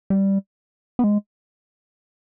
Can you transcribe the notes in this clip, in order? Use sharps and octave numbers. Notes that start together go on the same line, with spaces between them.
G3
B3
G#3